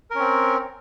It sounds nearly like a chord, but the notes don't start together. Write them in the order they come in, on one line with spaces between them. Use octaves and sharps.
A#4 C#4 C4